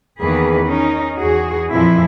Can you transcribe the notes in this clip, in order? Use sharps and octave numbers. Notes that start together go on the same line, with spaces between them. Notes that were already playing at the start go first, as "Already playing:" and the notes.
E2 D#3 A#3 G#4 B4
C#4 D#4 A#4
E2 F#4 G#4
F2 A#2 E3 F3 E4